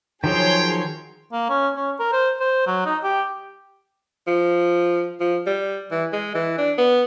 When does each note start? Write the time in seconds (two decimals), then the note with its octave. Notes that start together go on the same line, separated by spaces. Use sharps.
0.24 D#3 F3 F#3 G#4 C#5 G5 C6
1.32 A#3
1.49 C#4
1.76 C#4
2.00 A#4
2.13 C5
2.40 C5
2.67 F#3
2.86 D#4
3.03 G4
4.27 F3
5.20 F3
5.46 G3
5.91 E3
6.13 G#3
6.35 E3
6.58 D4
6.78 B3